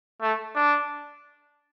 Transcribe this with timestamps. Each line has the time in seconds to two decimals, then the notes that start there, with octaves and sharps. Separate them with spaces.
0.22 A3
0.56 D4